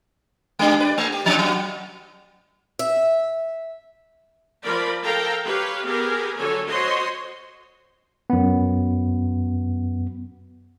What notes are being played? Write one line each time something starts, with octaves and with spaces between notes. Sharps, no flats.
G#3 D4 G4
B4 D5
A3
G4
C3 F3 C#4
F#3 F#4
E5
F3 A#4 D5 B5
A4 A#4 F5 G5 A#5
G4 B4 C#5 F5
B3 G4 G#4 A#4 B4 G#5
D3 F#3 A4 C#5 G#5
F#4 C5 C#5 D#5 C6
F#2 B3